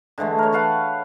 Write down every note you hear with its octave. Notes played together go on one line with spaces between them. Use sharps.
D3 E3 G#3 A3
A#4 C#5
A4 B4 F5 F#5